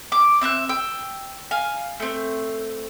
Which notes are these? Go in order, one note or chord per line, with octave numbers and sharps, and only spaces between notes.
D6
C4 E5 A#5 F#6
G5 E6
F5 G#5
A3 C4